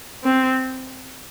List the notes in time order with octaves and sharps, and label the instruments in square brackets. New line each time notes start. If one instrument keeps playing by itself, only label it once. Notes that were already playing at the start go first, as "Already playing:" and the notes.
[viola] C4